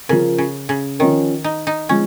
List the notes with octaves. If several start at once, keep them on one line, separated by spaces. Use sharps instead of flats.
C#3 F3 C#4 A#4
C#3
C#3
D#3 F3 C#4 A#4
D#4
D#4
F3 G#3 C#4